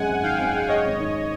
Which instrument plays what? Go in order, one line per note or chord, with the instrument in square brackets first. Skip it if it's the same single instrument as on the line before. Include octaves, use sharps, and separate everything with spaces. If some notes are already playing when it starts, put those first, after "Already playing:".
Already playing: [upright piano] F#2 G#3 [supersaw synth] F#5 G#5
[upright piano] G#1
[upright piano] D#3 [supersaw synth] F5 G5
[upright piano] G#1
G#3
[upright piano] G#3 [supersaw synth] C#5 D#5
[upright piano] G#1
D#3